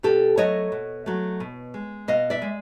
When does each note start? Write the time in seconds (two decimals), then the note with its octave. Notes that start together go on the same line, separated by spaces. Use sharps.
0.03 B2 G4 A4
0.37 F#3 A3 C#5 D#5
0.72 B2
1.06 F#3 A3
1.40 B2
1.74 G#3
2.08 B2 D#5 F5
2.30 D5 E5
2.42 G#3